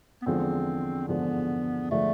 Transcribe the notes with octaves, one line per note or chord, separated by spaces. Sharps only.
B3
E2 D3 F3 G#3 C4 D4
E2 D3 F3 G#3 B3 D4
D3 F3 G#3 A3 D4